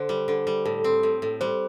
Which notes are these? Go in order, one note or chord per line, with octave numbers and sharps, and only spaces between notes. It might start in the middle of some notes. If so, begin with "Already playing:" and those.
Already playing: D3 C5
G3
D3
G3
A2 A4
C4
A2
A2
G3 C5